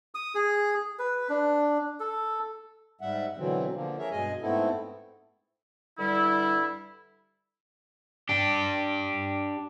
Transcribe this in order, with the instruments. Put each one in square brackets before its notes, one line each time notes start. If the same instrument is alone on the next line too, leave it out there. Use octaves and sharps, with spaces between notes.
[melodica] D#6
G#4
B4
D4
A4
[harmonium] G#2 G3 E5 F#5
B2 D3 E3 F#3 C4
D3 F3 A#3
G#4 A#4 C#5 E5
G2 B2 G#3 G#4 D#5 G#5
G#2 A3 B3 C4 E4 A4
[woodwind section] G2 D3 G3 E4
[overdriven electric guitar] D4 G4